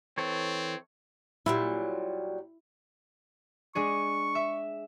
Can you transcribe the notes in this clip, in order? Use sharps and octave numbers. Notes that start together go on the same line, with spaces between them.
E3 C4 A4 C#5
A#2 F#3 G3 E4
G#3 D4 G#4 C#6
E5